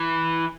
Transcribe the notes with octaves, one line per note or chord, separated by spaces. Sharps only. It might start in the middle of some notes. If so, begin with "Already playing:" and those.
Already playing: E3